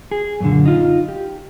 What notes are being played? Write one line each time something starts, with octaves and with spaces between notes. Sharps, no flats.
G#4
F#2 A#2 D3
D#4 F4
G4